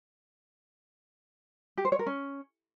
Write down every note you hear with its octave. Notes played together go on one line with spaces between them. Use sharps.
G4
C5
C#5
A#4
C#4